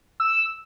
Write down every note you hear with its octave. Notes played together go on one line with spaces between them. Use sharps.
E6